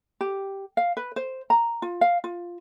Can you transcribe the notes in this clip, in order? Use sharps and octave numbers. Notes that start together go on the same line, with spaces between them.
G4
F5
B4
C5
A#5
F4
F5
F4